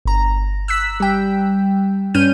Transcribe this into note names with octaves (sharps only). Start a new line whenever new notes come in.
G1 A#5
E6 F#6 B6
G3 G5
G2 C#4 F6 G6 D#7